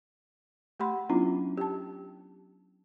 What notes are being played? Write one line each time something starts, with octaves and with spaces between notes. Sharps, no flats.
A3 G4 F#5 B5 C6
F#3 B3 C#4 D4 E4 F4
G4 G5 A5